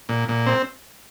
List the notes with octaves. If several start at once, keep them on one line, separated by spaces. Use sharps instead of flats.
A#2
A#2
C4